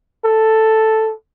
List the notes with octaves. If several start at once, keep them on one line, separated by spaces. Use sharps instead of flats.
A4